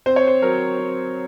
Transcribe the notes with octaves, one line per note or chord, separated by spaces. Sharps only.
C4 C5
C#5
C5
F#3 A#4
C4